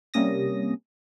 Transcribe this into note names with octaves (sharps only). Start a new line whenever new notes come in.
C3 G3 A#3 C#4 D#6 A#6